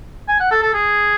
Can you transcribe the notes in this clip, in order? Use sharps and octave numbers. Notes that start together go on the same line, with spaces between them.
G#5
F#5
A4
A4
G#4